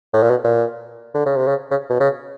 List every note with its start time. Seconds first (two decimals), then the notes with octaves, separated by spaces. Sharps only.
0.14 A2
0.23 A#2
0.30 B2
0.44 A#2
1.14 D3
1.26 C#3
1.37 C3
1.48 C#3
1.71 C#3
1.90 B2
2.00 C#3